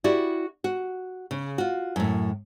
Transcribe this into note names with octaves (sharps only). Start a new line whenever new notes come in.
E4 F#4 G4 D5
F#4
C#3
F4 F#4
F#2 A2